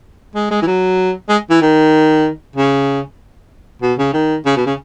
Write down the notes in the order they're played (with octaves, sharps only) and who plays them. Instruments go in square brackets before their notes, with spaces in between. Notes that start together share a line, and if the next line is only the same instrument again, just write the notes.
[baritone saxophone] G#3
G#3
E3
F#3
G#3
E3
D#3
C#3
B2
C#3
D#3
C#3
B2
C#3